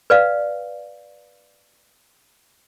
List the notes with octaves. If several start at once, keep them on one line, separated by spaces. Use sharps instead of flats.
B4 D5 F5